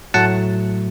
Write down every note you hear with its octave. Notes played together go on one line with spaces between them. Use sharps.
A2 F#3 A3 F#5 A5